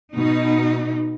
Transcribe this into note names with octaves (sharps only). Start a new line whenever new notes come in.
B2 D#4